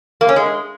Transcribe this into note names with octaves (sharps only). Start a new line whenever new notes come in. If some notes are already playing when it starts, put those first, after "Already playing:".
A#3
C#4
G#3